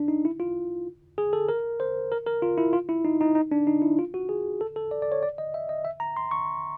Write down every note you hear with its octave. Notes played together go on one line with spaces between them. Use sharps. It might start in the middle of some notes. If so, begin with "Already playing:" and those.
Already playing: D4
D#4
E4
F4
G#4
A4
A#4
C5
A#4
A#4
F4
E4
F4
E4
D#4
D#4
D#4
D4
D#4
E4
F4
F#4
G#4
A4
A4
D5
D5
C#5
D5
D#5
E5
D#5
E5
A#5
C6
C#6